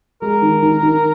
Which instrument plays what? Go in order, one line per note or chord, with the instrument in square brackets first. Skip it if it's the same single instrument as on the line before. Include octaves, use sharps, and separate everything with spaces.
[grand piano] G#3 [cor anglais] A#4
[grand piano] D#3
D#3
D#3